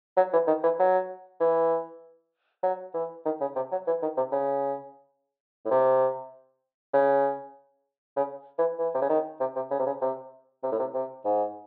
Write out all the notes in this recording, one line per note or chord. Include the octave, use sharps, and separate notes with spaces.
F#3
E3
D#3
E3
F#3
E3
F#3
E3
D#3
C#3
C3
F#3
E3
D#3
C3
C#3
A2
C3
C#3
C#3
E3
E3
C3
C#3
D#3
C3
C3
C#3
C3
C#3
C3
C3
A2
C3
C3
G#2